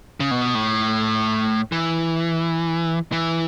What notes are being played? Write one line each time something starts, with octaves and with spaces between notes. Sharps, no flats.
C#3
B2
A2
E3
E3